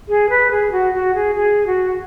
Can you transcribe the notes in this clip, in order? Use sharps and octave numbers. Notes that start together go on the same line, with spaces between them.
G#4
B4
G#4
F#4
F#4
G#4
G#4
F#4